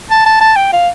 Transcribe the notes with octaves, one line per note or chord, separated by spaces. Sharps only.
A5
A5
A5
G5
F5